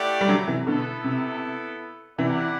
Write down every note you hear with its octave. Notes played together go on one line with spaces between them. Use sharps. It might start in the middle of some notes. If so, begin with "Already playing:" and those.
Already playing: A3 E4 G4 D5 F#5
G3
D3 F#3
C3 E3
B2 D3 B3 E4 A4
C3
C3 E3 E4 G4 D5 F#5